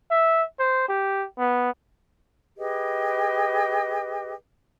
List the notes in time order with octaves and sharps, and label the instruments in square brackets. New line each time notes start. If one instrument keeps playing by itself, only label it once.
[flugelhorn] E5
C5
G4
B3
[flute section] G4 G#4 B4 D#5